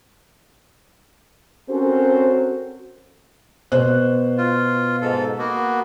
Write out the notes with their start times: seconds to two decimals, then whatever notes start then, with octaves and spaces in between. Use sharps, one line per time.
1.69 C4 C#4 F#4 A4 A#4 C5
3.72 B2 C5 F#6
4.38 F4
5.02 G#2 A4
5.39 A#3 B3 F#4